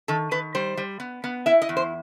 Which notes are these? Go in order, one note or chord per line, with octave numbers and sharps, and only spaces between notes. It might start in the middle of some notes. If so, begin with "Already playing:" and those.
D#3 A4
D#3 B4
G3 C5
G3
B3
B3
E4 E5
D#5
E2
C5